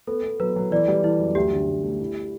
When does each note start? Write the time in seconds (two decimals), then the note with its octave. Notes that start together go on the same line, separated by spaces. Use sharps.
0.07 B3 A4
0.23 B3
0.40 F#3 B4
0.56 F#3
0.71 E3 B4 D5
0.88 G3
1.04 E3 E4
1.19 F#2
1.35 D2 G4
1.52 D3
1.68 D2
1.83 A3
2.00 E4